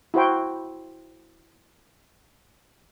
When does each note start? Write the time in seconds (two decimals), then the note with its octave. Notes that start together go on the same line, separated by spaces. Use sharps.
0.14 E4 F#4 C5 G5